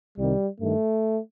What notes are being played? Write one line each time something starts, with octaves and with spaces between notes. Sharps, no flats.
C2 C3 D#3 G3
G2 D#3 A3